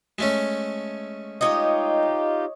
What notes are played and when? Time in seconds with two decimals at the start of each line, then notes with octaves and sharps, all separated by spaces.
0.19 G#3 A3 C#4
1.41 D#4 F4 G4 C#5 D#5